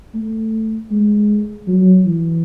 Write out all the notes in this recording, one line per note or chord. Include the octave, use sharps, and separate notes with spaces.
A3
G#3
F#3
E3